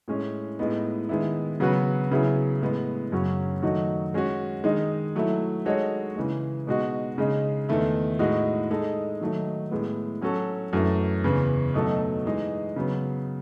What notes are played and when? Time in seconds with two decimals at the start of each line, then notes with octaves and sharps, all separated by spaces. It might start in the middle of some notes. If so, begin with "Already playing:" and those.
0.08 A2 G#3 C#4
0.59 A2 G#3 B3 D#4
1.09 D#3 G#3 B3 E4
1.60 C#3 F#3 B3 F#4 B4
2.11 C#3 F#3 B3 E4 G#4
2.61 A2 G#3 B3
3.12 F#2 C#3 F#3 C#4 F#4
3.62 D#3 F#3 A3 D#4 F#4
4.14 G#3 C#4 F#4
4.64 D#3 G#3 D#4
5.16 F#3 A3 E4
5.65 G#3 D#4 F#4 A4 C#5
6.16 C#3 E3 G#3
6.67 B2 G#3 D#4 F#4
7.18 C#3 G#3 D#4
7.69 E2 D#3 A3 E4
8.19 A2 G#3 D#4 F#4
8.71 G#3 D#4 A4
9.21 D#3 F#3 A3 D#4
9.71 A2 G#3 B3
10.22 F#3 C#4 F#4 A4
10.73 F#2 E3 A3
11.24 E2 C#3 E3
11.74 B2 F#3 A3 D#4 A4
12.26 E3 G#3 D#4 G#4
12.76 C#3 F#3 B3